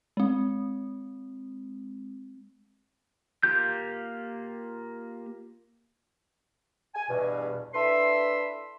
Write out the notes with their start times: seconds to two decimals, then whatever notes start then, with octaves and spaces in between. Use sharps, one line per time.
0.17 G#3 C4
3.43 A#3 F4 G4 G6
6.95 G#5
7.09 E2 G2 B2
7.74 D4 E4 A4 B4 E5 C6